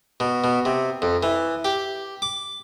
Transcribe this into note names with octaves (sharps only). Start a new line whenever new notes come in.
B2
B2
C3
F2
E3
G4
D6